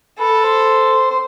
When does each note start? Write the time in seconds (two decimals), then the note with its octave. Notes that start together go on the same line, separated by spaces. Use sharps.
0.19 A4 B4
0.43 C5
1.10 C5